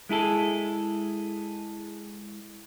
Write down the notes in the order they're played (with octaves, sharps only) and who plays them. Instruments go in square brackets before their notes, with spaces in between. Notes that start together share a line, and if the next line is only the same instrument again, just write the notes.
[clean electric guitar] G#3 E4 G#4 A4